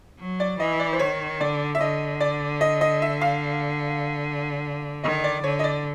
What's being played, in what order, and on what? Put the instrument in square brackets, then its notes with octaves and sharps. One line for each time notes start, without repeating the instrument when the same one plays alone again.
[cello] F#3
[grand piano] D5
[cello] E3 [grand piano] D#5
[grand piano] D5
C5
[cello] D#3 [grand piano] C#5
[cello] D3 [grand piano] D5
[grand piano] E5
[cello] D3 [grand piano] D#5
[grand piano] D5
D#5
D#5
E5
F5
[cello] D#3 [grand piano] D#5
[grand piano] D5
[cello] D3 [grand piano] C#5
[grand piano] D#5
D5